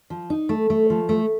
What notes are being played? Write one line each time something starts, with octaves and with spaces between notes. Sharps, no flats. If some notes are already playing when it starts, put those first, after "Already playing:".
F3
D#4
A3
A3
F3
A3